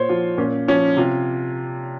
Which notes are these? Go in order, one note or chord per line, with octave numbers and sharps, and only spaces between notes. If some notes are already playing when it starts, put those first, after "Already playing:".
Already playing: A#2 C5 C#5
F3 F4
A#2 C#4
F3 C#4
C3 F4